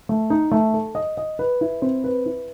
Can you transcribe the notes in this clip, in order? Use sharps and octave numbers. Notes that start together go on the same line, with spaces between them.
A3
D#4
A3
A4
D#5
D#5
B4
E4
C4
B4
E4